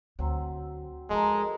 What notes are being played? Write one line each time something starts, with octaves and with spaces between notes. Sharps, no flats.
D2 F#3 C4 C6
F3 G#3 E4 A4 A#4 E5